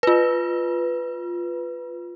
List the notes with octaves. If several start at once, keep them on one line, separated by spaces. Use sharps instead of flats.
F4 B4